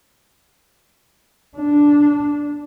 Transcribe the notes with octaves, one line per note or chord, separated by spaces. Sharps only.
D4